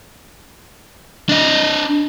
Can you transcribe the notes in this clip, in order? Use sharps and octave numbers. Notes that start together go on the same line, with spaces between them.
D4 D#5